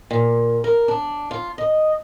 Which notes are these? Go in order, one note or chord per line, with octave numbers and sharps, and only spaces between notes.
A#2
A#4
D4
F4
D#5